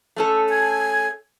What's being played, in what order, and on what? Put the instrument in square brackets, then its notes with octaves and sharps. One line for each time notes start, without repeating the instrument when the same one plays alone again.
[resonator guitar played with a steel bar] A3 C#4 A4
[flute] G#5